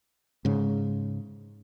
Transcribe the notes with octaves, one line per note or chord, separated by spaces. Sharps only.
G#2 C#3